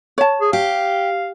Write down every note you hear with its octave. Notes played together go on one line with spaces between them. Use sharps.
C#5 A5
G#4
G4 F5